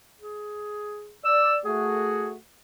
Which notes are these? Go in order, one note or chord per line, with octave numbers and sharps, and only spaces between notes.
G#4
D5 E6
A3 F#4 G#4